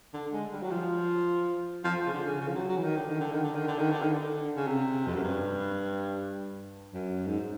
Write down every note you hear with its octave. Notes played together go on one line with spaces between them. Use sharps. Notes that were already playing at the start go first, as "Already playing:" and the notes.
D3
G#3
G3
F#3
F3
F3
C#3
D3
C#3
C#3
F3
F#3
F#3
E3
D#3
D3
D#3
D3
D#3
D3
D#3
D3
D#3
D3
D#3
D3
C#3
C3
F2
F#2
G2
F#2
G#2